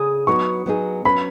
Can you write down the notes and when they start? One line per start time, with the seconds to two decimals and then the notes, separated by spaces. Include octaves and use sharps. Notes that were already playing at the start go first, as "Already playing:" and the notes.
Already playing: C#3 G#4 D#6
0.27 F#3 B3 D#4 F#4 B4 C#6
0.66 F#3 B3 D#4 G#4
1.05 F#3 C#4 B4 B5